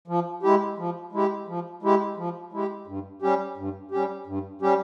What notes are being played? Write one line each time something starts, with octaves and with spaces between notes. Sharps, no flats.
F3
G#3 E4 G4
F3
G#3 E4 G4
F3
G#3 E4 G4
F3
G#3 E4 G4
G2
G3 C#4 G4
G2
G3 C#4 G4
G2
G3 C#4 G4